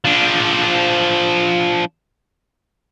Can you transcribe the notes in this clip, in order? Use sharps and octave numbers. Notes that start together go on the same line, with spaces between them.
F3 D4